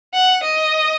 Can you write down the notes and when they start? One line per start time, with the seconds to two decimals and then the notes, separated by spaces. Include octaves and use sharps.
0.14 F#5
0.44 D#5